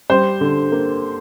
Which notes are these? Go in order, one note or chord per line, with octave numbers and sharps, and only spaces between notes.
G3 C5
D3
A#3